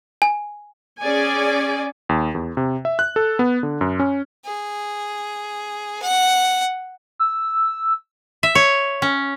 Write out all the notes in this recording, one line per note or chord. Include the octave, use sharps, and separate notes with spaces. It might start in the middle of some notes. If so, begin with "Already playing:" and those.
G#5
C#4 G#4 D5 G#5
D#2
E2
C3
E5
F#6
A4
B3
D3
F#2
C#4
G#4
F#5
E6
E5
C#5
C#4